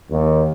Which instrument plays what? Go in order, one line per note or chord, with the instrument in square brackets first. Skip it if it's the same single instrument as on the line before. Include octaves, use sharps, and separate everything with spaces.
[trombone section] D#2